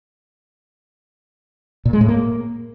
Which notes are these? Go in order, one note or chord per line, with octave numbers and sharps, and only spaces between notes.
A#2
G#3
A2
A#3